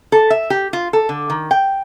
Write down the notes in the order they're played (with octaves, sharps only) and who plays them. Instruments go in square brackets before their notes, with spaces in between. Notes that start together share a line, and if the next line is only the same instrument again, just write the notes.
[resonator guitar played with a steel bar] A4
E5
G4
F4
A4
D3
D#3
G5